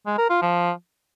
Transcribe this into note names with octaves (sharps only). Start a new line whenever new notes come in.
G#3
A#4
F4
F3